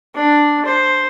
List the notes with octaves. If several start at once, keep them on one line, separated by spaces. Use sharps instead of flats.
D4
C5